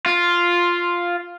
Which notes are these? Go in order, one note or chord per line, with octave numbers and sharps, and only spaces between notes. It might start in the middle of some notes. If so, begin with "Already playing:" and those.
F4